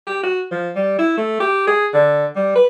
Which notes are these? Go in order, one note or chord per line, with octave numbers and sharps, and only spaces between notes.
G4
F#4
F3
G3
E4
A3
G4
G#4
D3
G3
B4